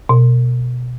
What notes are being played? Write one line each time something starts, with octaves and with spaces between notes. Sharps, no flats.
B2